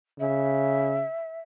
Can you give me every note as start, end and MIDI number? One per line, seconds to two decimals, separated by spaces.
0.19 1.04 49
0.19 1.40 76